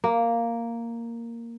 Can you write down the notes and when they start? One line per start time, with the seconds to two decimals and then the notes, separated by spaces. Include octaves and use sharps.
0.04 A#3